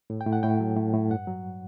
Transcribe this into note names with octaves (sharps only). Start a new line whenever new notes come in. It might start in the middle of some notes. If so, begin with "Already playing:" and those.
A2
G5
A2
F#5
A2 G5
F#3
A2
A2
G2 F#5
F#3